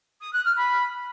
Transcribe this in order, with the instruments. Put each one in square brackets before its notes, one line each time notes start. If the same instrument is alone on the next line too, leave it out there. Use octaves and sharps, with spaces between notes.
[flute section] D#6
F#6
F6
B5